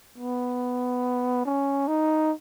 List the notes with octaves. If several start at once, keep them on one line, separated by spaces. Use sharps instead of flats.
B3
C#4
D#4